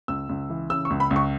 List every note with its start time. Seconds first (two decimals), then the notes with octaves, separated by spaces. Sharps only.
0.08 C#2 E6
0.29 C#2
0.50 E3
0.70 C#3 E6
0.85 C#6
0.90 C#2
1.00 B5
1.11 C#2
1.16 C#6